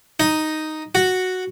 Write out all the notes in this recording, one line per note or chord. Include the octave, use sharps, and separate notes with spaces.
D#4
F#4